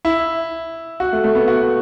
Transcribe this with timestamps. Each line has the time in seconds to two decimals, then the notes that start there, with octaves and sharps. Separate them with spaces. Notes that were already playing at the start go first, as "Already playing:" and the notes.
0.05 E4
1.00 F#4
1.12 A3
1.24 A3
1.35 B3
1.48 F#4